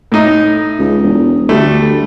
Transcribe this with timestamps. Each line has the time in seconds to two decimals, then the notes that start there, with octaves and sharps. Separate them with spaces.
0.12 A2 D#4
0.79 C#2
1.03 E1
1.49 D2 G3 A3